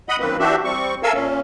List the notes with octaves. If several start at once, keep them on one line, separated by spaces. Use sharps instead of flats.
D#5 F#5 B5 D#6
F#2 D#3 A#3 C4 B4
E3 D4 F#4 G4 E5
G3 C4 C#6
A4 A#4 E5 F5 G#5 E6
A#2 C#4